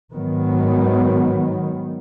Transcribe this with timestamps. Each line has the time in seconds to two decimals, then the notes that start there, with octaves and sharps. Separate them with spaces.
0.13 G#2 D#3 F#3 B3